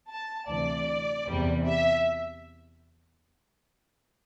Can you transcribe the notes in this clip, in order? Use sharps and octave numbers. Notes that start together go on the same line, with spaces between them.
A5
D2 C3 E3 D5
E2 C3 E3 G3
E5